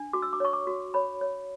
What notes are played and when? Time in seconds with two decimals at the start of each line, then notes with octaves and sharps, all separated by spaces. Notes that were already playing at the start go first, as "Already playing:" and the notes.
Already playing: D4
0.13 F#4 D6
0.22 E6
0.33 D6
0.40 C#5 C#6
0.53 D6
0.67 F#4
0.94 C#5 B5
1.21 C#5